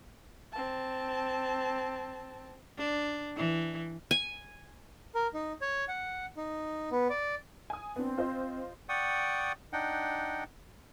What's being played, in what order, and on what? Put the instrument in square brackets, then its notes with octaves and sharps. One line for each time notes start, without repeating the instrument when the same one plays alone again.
[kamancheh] C4 A5
[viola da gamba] D4
E3
[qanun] G#5
[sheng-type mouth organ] A#4
D#4
C#5
F#5
D#4
B3
D5
[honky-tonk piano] G#5 D#6
[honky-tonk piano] B3 D4 [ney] C4
[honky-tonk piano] F4 C5 D#5
[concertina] D5 F#5 G5 C#6 D#6
D4 D#4 F#5 G5